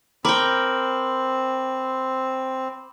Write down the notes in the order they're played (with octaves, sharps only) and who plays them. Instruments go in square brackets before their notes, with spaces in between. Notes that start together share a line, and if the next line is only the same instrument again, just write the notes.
[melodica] C4 [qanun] A#4 G5 [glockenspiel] B5 D6 F#7